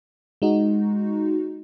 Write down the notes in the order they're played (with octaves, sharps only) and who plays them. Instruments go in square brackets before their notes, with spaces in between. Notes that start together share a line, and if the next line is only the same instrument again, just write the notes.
[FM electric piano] G#3 D#4 F#4